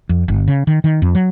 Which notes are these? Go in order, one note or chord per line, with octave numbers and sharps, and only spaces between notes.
F2
G1
C#3
D#3
D#3
F2
F#3